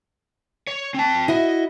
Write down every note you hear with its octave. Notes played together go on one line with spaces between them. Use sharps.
C#5
C4 A5
E4 F#4 D#5